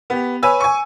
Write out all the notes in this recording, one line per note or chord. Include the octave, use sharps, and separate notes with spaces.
B3 G4
B4 C#5 G#5 E6
G#5 C#6